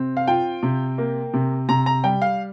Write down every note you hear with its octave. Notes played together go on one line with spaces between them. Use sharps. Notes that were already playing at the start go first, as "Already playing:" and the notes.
Already playing: C3 C4
F5
F4 G5
C3
A#3
C3
C3 A#5
A#5
G3 G5
F5